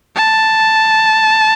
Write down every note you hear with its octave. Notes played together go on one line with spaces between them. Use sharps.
A5